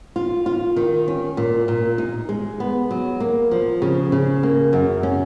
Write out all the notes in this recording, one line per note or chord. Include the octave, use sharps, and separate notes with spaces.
F4
F4
D#3
C#4
A#2
A#2
D#4
G#3
B3
F#3
A#3
F3
C#3
C#3
A#3
F#2
C#4